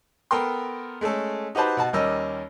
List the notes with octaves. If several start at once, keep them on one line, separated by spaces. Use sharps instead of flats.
B3 A4 A#4 G5 C6
G#3 A3 C#4 A4
D#4 F#4 G4 B4 C5 A5
B2 F#4 A5
D#2 G3 C#4 A#4 D#5 E6